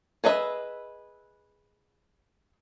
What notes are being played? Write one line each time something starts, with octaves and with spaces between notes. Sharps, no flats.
G#4 B4 D#5 E5